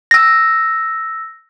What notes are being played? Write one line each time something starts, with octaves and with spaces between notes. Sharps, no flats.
E6 A#6